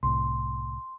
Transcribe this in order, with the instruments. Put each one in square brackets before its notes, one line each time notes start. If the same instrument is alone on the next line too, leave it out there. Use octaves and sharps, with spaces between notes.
[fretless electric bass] C2 A2 [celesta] C6